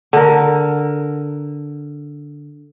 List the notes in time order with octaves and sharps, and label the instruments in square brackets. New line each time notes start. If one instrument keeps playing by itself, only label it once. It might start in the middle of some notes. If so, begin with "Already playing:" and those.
[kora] D3 A#4